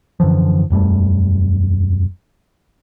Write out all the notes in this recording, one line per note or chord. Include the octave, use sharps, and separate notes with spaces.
F#2 D3 E3 F3
E1 F#2 G3 A3